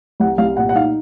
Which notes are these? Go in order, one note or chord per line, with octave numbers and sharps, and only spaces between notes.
C2 F#5
C2 F5
A#2 F#5
F#5
D#4 F5